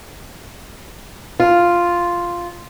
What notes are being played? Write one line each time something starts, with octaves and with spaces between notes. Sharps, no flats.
F4